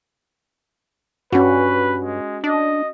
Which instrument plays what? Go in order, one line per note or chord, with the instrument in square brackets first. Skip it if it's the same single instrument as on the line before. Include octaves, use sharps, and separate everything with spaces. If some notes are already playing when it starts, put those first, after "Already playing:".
[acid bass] G2 [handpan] C#4 F#4 [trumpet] B4
[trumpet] G#3
[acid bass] D4 [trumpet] D#5